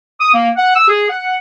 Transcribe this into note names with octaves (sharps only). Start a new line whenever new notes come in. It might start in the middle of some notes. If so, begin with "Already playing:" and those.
D#6
A#3
F#5
E6
G#4
F#5